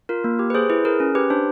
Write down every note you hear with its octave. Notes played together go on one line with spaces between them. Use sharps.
F4 A#4
A#3
G4
B4
G#4 C5
E4 B4
G#4 A#4
C#4
G4 B4
D4 C5